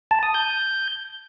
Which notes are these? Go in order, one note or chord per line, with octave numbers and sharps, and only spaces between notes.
A5
D#6
G6